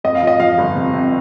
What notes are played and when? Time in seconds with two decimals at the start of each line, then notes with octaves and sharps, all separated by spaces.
0.04 F2 D#5
0.15 F5
0.22 F3 D#5
0.40 F3 F5
0.58 G1
0.76 C3
0.93 C3